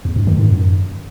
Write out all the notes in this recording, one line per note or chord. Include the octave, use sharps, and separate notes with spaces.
E2
G2
D#3
G#2
F#2